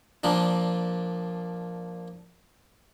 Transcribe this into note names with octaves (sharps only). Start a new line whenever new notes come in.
A#2 F3 A#3 D4